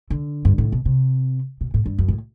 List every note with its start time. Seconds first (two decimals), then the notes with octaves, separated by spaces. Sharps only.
0.10 D3
0.45 G2
0.58 A2
0.72 B2
0.85 C3
1.61 B2
1.74 A2
1.86 G2
1.98 F#2
2.08 A2